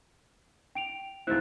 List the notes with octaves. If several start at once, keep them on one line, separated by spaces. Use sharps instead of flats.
G5 D7 F7
C#2 D#3 C4 E4 F#6 A6